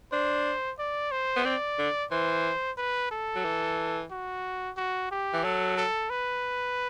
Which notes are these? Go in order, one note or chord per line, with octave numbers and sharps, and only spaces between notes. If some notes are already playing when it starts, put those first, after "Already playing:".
D4 C5
D5
C5
B3
C4 D5
D3
E3 C5
B4
A4
F#3
E3
F#4
F#4
G4
E3
F#3 A4
A4
B4